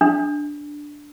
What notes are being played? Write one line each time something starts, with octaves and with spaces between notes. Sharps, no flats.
D4